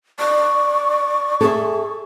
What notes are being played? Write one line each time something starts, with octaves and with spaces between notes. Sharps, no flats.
D5 C#6
G#4 A4 E5